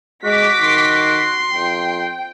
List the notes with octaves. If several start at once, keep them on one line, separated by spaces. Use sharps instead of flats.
G#3 F#4 D6 B6
D#3 C6
F2 G5